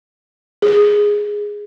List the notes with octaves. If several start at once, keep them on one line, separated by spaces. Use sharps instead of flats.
G#4